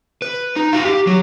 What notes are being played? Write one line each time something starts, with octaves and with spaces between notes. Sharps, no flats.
B4
D#4
F#4 F5
G4
F#3